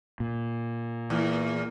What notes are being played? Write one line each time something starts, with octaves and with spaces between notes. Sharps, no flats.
A#2
E2 A#3